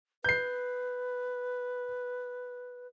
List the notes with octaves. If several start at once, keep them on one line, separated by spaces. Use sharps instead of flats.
B4 G6 C7